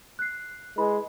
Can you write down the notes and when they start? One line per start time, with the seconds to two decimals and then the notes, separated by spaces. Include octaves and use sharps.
0.19 F#6 C7
0.77 G#3 E4 B4 B5